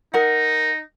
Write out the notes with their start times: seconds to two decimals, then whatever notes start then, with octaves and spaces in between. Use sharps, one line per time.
0.14 D#4 A#4 F#5